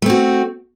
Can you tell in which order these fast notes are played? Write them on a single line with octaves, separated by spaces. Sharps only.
A3 C4 F#4